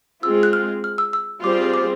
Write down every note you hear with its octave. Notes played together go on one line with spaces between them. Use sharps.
G#3 C4 F4 G#4 E6
F#6
F6
F6
E6
E6
G3 C4 F4 G#4 C5 D6
D6